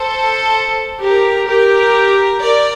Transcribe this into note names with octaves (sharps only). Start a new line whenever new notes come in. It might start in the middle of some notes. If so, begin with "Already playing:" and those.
Already playing: A4 C5
G4 A#4
G4 A#4
A#4 D5